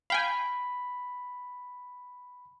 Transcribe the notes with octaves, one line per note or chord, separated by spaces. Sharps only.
F5 G5 G#5 B5